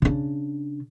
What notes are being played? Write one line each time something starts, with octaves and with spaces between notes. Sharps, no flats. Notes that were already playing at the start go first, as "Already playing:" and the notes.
C#3 D4